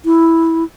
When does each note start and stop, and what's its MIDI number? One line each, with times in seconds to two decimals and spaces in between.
0.05 0.64 64